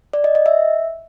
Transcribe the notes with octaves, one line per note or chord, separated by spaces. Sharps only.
D5
D#5
D#5
E5